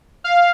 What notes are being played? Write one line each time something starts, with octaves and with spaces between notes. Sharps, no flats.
F5